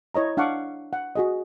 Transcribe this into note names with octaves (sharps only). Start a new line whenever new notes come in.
E4 C#5 D#5 A#5
D4 F5 F#5 A5 C#6 D6
F#5
F#4 G#4 D#5